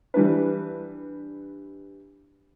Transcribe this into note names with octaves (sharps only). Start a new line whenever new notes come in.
E3 G3 D4 B4